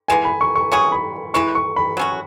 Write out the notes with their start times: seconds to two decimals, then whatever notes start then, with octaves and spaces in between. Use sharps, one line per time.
0.08 E3 G#3 B3 G#5
0.25 B5
0.41 C#6
0.55 C#6
0.72 F#3 C#4 E4 G#4 C#6
0.92 B5
1.34 E3 G#3 E4 B4 C#6
1.55 C#6
1.76 B5
1.97 F#3 C#4 F#4